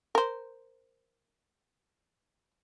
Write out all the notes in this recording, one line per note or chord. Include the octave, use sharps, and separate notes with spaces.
A#4 C5